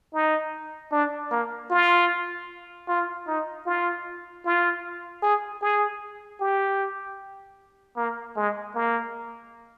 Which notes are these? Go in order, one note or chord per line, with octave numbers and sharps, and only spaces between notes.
D#4
D4
A#3
F4
F4
D#4
F4
F4
G#4
G#4
G4
A#3
G#3
A#3